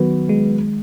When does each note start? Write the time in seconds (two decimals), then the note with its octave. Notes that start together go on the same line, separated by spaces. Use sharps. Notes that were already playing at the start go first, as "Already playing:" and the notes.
Already playing: D#3 F#3 B3 F#4 B4
0.29 G#3